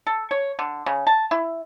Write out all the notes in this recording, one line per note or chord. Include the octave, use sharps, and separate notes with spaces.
A4
C#5
D3
C#3
A5
E4